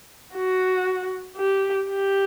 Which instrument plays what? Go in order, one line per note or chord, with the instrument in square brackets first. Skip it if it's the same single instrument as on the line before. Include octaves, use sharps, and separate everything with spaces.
[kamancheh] F#4
G4
G4